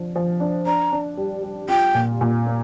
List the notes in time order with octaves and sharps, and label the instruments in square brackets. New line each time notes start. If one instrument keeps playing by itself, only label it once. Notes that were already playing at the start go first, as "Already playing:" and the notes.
Already playing: [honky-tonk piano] F3 D4
F3
D4
[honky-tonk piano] D4 [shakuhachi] A#5
[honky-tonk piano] D4
G3
G3
[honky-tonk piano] F4 [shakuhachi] G5
[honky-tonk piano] A#2
A#2
A#3